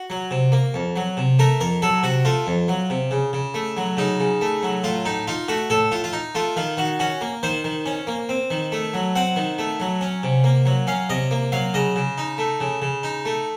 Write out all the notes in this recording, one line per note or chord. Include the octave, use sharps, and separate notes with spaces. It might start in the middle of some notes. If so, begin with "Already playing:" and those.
Already playing: F#4
F#3
C3
A#3
F2
F#3
C3
A3 A#4
F2 A#4
F#3 A4
C3 F#4
A3 F4
F2
F#3
C3
C#3
C#3
A3
F#3
C#3 D#4
C#3
A3
F#3
A2 F4
A2 D#4
D#4 F4
A3 F#4
A2 A4
A2 F4
F4
D#4
A3 F4
D#3 F4
D#3 F#4
C#4 F#4
A#3
D#3 C5
D#3
C#4
A#3
C4
D#3
A3
F#3
C4 F#5
D#3
A3
F#3
C#4
C3
A#3
F#3
C#4 F5
C3 D#5
A#3
F#3 F5
C#3 D#5
C#3
D#4
A3
C#3
C#3
D#4
A3